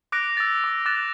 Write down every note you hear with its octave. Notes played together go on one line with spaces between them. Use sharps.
D6 F#6 A#6 D7
E6 A6
D6
D6 F#6 A6 E7